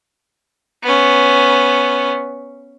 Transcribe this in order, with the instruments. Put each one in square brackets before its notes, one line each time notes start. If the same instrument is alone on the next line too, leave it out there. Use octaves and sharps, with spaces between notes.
[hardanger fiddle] B3 C#4